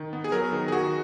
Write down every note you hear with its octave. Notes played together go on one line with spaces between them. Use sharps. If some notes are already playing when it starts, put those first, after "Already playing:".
Already playing: D#3
B3
G#4
F#3 A#4
D#3
G#4
D#3 F#4